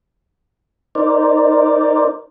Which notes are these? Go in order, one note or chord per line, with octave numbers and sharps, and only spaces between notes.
D#4 A#4 C5 D5